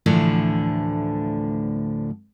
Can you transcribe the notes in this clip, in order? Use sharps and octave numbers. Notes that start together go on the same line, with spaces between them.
D2 A2 D3 E3 F3 D4